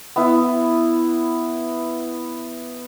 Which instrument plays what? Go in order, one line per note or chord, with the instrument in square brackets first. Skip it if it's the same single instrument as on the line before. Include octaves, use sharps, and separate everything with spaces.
[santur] B3 E4